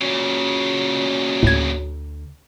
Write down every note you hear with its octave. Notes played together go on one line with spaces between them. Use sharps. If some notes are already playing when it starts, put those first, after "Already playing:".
A#2 C#3 F#3
D2 A2 G#6